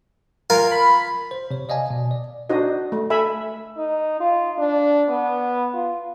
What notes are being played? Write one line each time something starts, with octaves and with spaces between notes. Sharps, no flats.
F4 A#4 F5 G#5
B5
C5
C3 C#5
D5 D#5 F5 G#5 A5
B2
D5
D4 D#4 F#4 C5 D#5
A3
A4 E5 G#5 B5
D#4
F4
D4
B3
F4